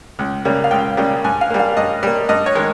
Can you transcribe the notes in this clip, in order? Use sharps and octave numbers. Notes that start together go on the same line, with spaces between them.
C#2
C#3 G3 A#3
F5
C#2 G5
C#3 G3 A#3
G2 G#5
F5
G3 A#3
F5
G2 D#5
G3 A#3
G2 D#5
C#5
D#3 G#3